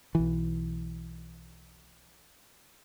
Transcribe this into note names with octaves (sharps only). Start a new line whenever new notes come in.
B1 E3